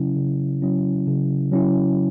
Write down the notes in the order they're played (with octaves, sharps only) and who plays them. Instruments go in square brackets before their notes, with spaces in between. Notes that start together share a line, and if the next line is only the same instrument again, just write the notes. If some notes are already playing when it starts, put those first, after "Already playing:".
Already playing: [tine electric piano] C#3 F#3 C#4 E4
C#3
F#3 C#4 E4
C#3
F#3 C#4 E4